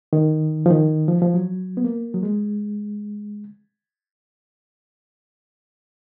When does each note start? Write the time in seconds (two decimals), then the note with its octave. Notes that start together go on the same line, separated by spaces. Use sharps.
0.13 D#3
0.66 F3
0.71 D#3
1.08 F3
1.22 F3
1.34 F#3
1.77 B3
1.84 A#3
2.14 F#3
2.23 G#3